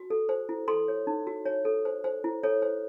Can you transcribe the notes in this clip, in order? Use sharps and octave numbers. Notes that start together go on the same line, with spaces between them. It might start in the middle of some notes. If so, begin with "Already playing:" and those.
Already playing: F#4
A4
C5
E4
A4 C6
C#5
D#4
F#4
C#5
A4
C5
C5
E4
A4 C#5
C5